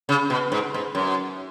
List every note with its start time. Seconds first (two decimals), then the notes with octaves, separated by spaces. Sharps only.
0.09 C#3
0.30 B2
0.52 G#2
0.74 G#2
0.95 F#2